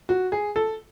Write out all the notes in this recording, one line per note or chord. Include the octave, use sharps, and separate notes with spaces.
F#4
G#4
A4